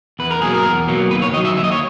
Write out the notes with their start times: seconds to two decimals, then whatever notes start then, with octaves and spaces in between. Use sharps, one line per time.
0.19 E2 B4
0.31 A#4
0.42 B2 F#3 A#3 G#4
0.54 A#4
0.65 E2
0.88 B2 F#3 A#3
1.11 D#2 B4
1.22 C#5
1.33 D#3 D#5
1.36 F#3
1.45 E5
1.57 D#2 E5
1.64 D#5
1.72 C#5